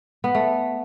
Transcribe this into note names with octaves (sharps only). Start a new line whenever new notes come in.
B3
A3